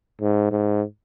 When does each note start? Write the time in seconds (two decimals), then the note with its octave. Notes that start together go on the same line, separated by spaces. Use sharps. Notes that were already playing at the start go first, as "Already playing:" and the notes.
0.21 G#2
0.51 G#2